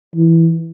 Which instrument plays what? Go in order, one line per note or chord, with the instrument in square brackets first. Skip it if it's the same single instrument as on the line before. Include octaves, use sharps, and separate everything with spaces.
[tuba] E3